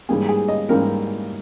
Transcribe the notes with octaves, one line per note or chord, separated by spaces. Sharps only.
G#2 E3 G3 A#3 G#4
G#4
D#5
G#2 E3 G3 A#3 A#4